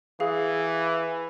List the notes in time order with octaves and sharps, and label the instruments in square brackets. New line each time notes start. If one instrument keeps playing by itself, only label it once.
[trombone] E3 [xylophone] G#4 F5